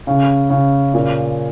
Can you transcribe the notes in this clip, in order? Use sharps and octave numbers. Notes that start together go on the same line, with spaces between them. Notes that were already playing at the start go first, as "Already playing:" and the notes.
C#3
C#3
A#2